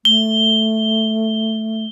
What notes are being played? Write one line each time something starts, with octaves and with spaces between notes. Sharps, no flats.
A3 G7